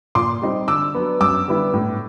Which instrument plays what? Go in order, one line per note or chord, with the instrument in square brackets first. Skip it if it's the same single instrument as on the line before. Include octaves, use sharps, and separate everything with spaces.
[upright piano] A#2 C6 D6
G3 C4 D#4
D3 D6 E6
F#3 B3 D4
F#2 D6 E6
D3 G3 B3 E4
A2